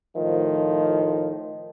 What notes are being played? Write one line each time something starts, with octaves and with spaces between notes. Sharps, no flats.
A2 D#3 F3